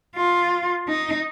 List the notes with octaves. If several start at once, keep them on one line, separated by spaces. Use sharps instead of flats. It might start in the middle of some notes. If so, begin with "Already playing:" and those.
F4
D#4